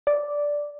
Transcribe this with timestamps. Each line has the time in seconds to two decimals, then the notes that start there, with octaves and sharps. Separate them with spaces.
0.07 D5